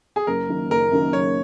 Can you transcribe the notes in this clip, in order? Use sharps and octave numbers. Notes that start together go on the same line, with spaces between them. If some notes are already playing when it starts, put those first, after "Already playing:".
G#4
F#1 A#4
F#2 D#3 A#3
F#1 A#4
F#2 D#3 A#3
F#1 C#5